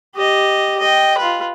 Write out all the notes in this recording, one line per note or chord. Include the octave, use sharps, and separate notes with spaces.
G4 D#5
D#5 G5
F4 B4